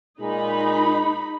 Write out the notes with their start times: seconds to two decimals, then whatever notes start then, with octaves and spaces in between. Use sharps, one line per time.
0.21 A#2 G#3 D#4 B5